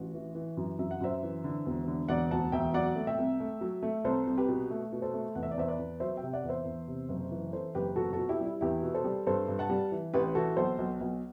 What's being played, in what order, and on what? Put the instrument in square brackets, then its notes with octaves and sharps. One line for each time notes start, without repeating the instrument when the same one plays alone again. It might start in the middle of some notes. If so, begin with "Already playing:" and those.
Already playing: [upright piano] A1 F#4
E3
E3
F#2
F#2 E5
F#5
F#2 C5 E5
E3
D3
E1
D3
E1 D5 F#5
D2 F#5 A5
E1 E5 G5
F#3 D5 F#5
A3
E5 G5
C2
A3
F#3
A3
C2 A4 C5
C2
G4 B4
B2
A3
B2
A4 C5
A3
E2 F#5
E5
D5
E2 C5 E5
B4 D5
E2
F#3 C5 E5
E5 G5
C3
D5 F#5
E2
C5 E5
E2
C3
F#1
E3
E3 A4 C5
F#1 G4 B4
B2 F#4 A4
F#4 A4
B2
E4 G4
G3
E4
E2 E4 G4
B2
A4 C5
G3
G2 A4 C5
G2
F#5 A5
G3
E3
A1 G4 B4
E3 F#4 A4
B1 A4 C5
B1
B1